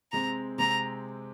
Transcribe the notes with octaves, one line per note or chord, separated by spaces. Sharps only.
C3 G#3 C4 A#5
C3 G#3 C4 A#5